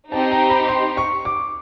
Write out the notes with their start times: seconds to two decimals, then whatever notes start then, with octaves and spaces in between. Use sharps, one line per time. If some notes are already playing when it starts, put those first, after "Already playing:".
0.12 C4 D#4 G4 A5
0.31 A#5
0.50 B5
0.68 C6
0.97 C#6
1.25 D6